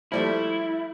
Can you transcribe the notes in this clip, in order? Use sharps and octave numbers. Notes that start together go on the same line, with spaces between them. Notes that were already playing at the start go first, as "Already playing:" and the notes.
F3 G3 A3 E4